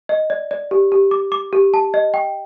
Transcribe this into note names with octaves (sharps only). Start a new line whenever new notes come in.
D#5
D5
D5
G4
G4
D6
D6
G4
A5
D#5
G5